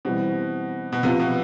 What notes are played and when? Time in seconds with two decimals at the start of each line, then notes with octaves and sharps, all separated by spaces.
0.05 B2 E3 G3 C4
0.92 B2
1.03 C3 F3 B3 F4
1.19 B2